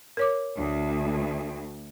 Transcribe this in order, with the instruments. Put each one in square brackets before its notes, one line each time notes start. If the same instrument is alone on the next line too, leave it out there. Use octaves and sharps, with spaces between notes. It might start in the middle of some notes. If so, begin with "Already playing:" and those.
[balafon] A#4 C#5 D6
[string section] D2